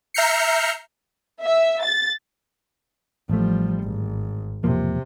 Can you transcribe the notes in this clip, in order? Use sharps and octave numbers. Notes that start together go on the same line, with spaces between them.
E5 A#5 F6 G6 C7 C#7
E5
A6
A1 F3 G3 A3
G#1
E1 C3 F3 A#3